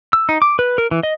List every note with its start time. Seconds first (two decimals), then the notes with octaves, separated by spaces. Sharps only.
0.13 E6
0.29 D#4
0.42 D6
0.59 B4
0.78 A#4
0.91 E3
1.03 D#5